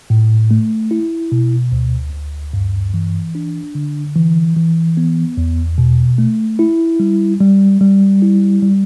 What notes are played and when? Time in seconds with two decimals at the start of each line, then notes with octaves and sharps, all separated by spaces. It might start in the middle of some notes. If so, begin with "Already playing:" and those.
0.10 A2
0.51 A3
0.91 E4
1.32 B2
1.72 D2
2.12 D2
2.53 G2
2.94 E3
3.35 D4
3.75 D3
4.16 E3
4.56 E3
4.97 B3
5.37 E2
5.78 B2
6.18 A3
6.59 E4
7.00 G3
7.40 G3
7.81 G3
8.22 E4
8.62 G3